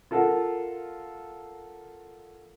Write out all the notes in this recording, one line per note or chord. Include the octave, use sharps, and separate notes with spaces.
F4 A4 A#4 F#5